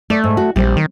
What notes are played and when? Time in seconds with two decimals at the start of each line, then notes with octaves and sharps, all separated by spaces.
0.10 A3 D5
0.24 G#2
0.37 F#4
0.56 A#1 G3 C4
0.77 D#3